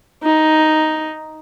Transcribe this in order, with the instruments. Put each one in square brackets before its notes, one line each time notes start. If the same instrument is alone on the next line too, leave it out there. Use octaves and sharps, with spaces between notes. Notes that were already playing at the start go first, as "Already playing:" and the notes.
[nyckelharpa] D#4